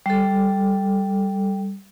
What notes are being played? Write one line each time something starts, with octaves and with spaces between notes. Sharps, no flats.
G3 A4